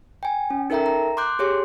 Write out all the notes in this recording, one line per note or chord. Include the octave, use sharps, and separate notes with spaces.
G5 G#5
C#4
D#4 A4 A#4 E5 G5 A#5
A#5
C6 D6 F#6 G6
G4 G#4 C#5 C6